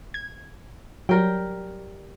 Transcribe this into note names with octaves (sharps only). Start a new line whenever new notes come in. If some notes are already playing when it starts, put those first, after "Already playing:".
G#6
F#3 G3 A#4 G5